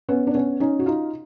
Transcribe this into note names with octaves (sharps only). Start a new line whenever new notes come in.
B3 C#4
D4
B3 C#4
C#4 D#4
F#4
D#4 F4